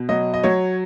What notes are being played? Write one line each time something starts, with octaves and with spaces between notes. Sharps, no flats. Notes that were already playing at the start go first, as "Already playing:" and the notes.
Already playing: B2
F#3 D#5
D#5
F#3 C#5